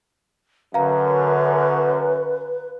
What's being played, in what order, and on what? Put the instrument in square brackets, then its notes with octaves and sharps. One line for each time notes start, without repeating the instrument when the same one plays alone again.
[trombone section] F#2 [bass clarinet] D3 [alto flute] B4 [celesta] F5 A#5